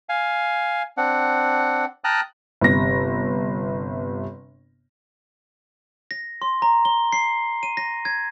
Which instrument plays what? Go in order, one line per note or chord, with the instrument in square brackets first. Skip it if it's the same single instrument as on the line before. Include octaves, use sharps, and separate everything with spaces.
[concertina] F5 G#5
C4 D4 F#5
G5 A5 A#5 D#6 F6 F#6
[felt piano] G1 C3 A#6
[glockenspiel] A#6
C6
A#5
G7
C7
D#7
A#6
G#6